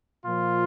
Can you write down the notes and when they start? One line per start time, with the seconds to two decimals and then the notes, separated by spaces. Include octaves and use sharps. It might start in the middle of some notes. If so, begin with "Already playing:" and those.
0.24 A#2 F3 F4